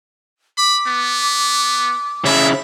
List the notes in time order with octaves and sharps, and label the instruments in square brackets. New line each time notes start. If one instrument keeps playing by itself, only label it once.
[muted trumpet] B5 [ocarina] D6
[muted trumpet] B3
[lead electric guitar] C#3 E4 [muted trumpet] E5